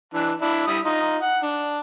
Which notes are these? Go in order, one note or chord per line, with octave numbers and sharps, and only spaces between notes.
E3 D4
D4 E4
G3 E4 D#6
D#4 F4
F#5
D4